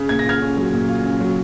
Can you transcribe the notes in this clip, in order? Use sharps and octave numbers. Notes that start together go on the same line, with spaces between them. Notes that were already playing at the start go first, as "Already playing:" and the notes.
Already playing: C#3
A#2 G#6
A#6
F4 F6 G#6
C#4
F#3
A#2
F4
C#4
F#3